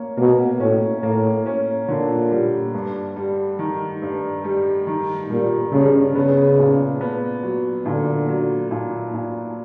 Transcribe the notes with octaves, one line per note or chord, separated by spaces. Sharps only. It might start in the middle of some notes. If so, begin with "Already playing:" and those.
Already playing: A#3 C#4
B2 A#3
A2 C#4
A2 A#3
C#4
A#2 D3
G3
G2
G3
D#3
G2
G3
D#3
A#2 G3
G2 C#3
C#3 B3
A#2
B3
F#3
A#2 D3
F#3
A#2
A#2